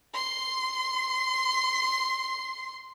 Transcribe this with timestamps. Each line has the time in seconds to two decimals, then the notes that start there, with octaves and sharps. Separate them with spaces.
0.14 C6 C7